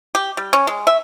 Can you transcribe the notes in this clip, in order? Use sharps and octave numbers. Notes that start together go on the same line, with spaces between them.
G4
G3
C#4
G#3
E5